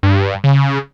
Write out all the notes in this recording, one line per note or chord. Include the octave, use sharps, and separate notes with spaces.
G2
C#3